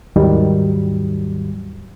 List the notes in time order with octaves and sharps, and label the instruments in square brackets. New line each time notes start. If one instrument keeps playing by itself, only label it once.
[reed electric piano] D#2 G#2 D#3 F#3 G3